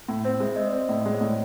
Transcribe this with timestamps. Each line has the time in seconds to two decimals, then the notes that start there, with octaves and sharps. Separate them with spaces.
0.08 A2
0.25 C4
0.40 G#3 E5
0.56 C4 D#5
0.67 C5 D5
0.73 C4
0.89 A2 D#5
1.01 G#3 D5
1.14 C#5 D#5
1.21 A2